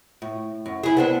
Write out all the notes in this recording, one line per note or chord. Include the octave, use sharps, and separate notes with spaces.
A2
F#2
E4 G#4
B3 C4 D4